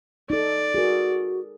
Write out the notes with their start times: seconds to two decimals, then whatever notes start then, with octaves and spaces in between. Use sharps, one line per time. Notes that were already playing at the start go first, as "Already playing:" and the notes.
0.30 D#4 A4 D5
0.75 F#4 G#4 A#4